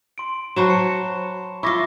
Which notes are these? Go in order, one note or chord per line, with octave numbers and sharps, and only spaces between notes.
C6 D7
F#3 F#4 C5 A5 B5 E7
C#6 C#7
E4 F4 C#6 D6 A#6